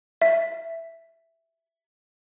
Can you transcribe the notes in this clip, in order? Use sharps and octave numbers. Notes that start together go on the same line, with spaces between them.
E5